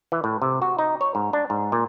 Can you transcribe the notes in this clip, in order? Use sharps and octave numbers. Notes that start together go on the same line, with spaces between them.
E3
A2
C3
F#4
D#4
C#5
G#2
D4
G#2
A#2